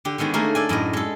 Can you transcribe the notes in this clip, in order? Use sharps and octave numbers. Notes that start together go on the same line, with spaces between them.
D3 G4
D3 D#3 G#3 B3 C#4
A3 A#3 G#4 A#4
A4 D5 G#5
F#2 A2 D5 D#5
G#3 A4